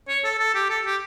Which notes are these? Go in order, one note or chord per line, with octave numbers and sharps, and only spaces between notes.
C#5
A4
A4
G4
A4
G4